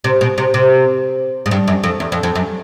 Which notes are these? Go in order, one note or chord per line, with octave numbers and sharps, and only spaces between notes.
C3
B2
C3
C3
G#2
G2
F#2
F2
E2
F2
F2
F#2